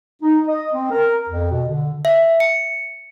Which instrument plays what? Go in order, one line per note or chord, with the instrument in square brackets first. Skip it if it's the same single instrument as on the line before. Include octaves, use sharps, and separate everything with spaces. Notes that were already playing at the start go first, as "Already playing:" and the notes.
[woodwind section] D#4
D#5
C4
A#4
F2
B2
D3
[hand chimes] E5
C#7